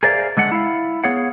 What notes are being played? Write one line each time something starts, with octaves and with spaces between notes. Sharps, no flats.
G#4 A#4 C5 D5 E5 F5
D3 G#3 A3 F#5
E4 F5
B3 G#4 C#5 F5 F#5